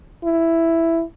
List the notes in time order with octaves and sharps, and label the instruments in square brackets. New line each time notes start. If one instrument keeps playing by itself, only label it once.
[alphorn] E4